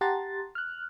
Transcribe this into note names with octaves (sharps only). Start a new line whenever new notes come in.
G4 F#5 A5 A#5 C6 A6
F6 F#6